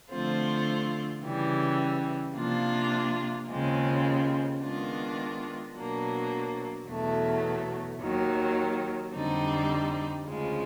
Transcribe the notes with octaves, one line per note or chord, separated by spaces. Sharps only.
D3 F3 A3 C4 F4
C#3 E3 G3
C3 F3 A#3 D4 F4
D#2 C#3 F3 G#3 C4
D#3 G#3 B3 D4 F4
B2 F#3 A#3 D4
E2 B2 F#3 A3
D#2 D#3 F#3
F2 D3 G3 C4 D#4
D2 C#3 F3 G#3